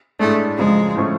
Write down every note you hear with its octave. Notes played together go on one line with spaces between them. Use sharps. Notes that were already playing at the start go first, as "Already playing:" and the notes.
A2 G#3 A3 D4
F#2 C#3 F3 G#3
A2 F3 A3 C#4